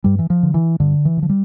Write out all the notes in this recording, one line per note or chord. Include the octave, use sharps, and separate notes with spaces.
G2 G3
E3
F3
D3
E3
G2 D3
E3
D3
F3
G3